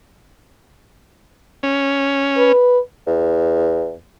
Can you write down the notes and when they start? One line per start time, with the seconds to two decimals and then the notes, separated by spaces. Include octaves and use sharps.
1.63 C#4
2.37 B4
3.07 E2